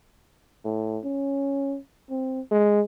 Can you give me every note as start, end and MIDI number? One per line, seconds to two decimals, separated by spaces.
0.65 0.99 45
1.04 1.78 61
2.10 2.41 60
2.51 2.81 56